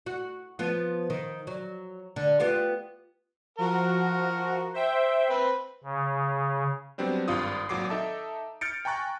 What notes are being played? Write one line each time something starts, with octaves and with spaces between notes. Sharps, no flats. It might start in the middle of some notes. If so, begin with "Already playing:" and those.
F#4
F3 B3 F4
D#3
F#3
D3
B3 F4 G4
F3 F#4 A#4
C5 E5 G5
C4 B4
C#3
F#3 G3 B3 C4 D4
G#1 G2 F4 D#6
G#1 A#2 F#3 D6 C7
D#4 A4 E5 A5
F6 G6 A6 C#7 D7
G5 G#5 A#5 C#6 F#6 A6